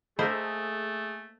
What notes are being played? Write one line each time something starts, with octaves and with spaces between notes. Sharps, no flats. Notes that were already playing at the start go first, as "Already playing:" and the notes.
A3 A#3 G#4 A4 C5 D#5 B5